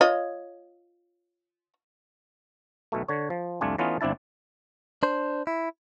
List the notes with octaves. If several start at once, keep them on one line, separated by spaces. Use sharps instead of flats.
F4 C#5 D#5
B1 B2 A3
D3 C#5
F3
C2 F2 A3 D4 F4 G#5
E3 A3 B3 C#4 D#4 F4
G1 C4 D4 E4 A5
D4 C5
E4